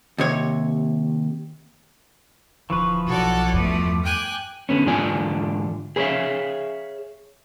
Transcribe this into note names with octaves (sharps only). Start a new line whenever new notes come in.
D#2 C3 C#5
D1 D3 E3 F3 B4 C#6
B1 F#4 A4 C#5 D5
E2 G2 B2 A3 D6
G5 G#5 F#6
D3 B3 C#4
G#2 D3 E3 F4 D5 G#5
G#4 B4 C#5 D5 E5 F5